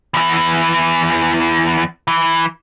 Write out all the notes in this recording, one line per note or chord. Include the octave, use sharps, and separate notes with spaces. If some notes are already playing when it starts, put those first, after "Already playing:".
E2 E3
E3